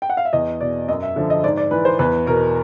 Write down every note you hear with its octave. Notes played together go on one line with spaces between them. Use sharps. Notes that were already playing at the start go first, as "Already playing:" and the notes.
G5
F#5
F5
E5
E2 D#5
B2 D5
F#2 D#5
E5
D3 F3
D#5
G#2 D5
D5
E3 B4
C5
E2 B4
B2 A#4